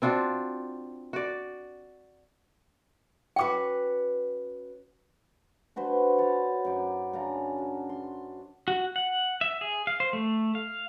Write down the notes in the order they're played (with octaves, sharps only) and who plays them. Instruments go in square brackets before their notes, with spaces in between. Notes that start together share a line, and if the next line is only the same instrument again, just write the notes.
[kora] C4 D4 F4 F#4
F#4 D5
[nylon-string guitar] C#4 F#4 B4 [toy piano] G5 D6
[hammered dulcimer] D4 F#4 B4 C5
C#5 A5
F#2 D#4 D6
C#3 C#4 D4 A#5
F#4
C6
[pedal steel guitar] F#4
F#5
E5
G#4
F5
C5
A3
F5